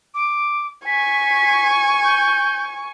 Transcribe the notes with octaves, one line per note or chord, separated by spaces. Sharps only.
D6
G#5 C#6 B6
G6